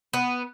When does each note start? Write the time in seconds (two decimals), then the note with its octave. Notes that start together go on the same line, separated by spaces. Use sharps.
0.13 B3